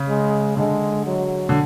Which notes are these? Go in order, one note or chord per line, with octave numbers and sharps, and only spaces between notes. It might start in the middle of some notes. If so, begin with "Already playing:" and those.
Already playing: C#3
G#3
D3 G#3
F#3
D3